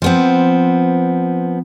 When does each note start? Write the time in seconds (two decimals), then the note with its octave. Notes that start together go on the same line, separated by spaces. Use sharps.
0.02 F3 B3 C4